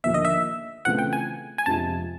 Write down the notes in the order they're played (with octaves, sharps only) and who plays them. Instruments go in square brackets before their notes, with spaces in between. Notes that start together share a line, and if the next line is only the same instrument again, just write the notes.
[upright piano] D#2 D3 F3 A#3 [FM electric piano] E5
[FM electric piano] D#5
E5
[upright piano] C#3 E3 A3 C4 F4 [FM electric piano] F#5
[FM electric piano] G5
G#5
G#5
[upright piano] F2 C3 F3 G#3 [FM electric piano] A5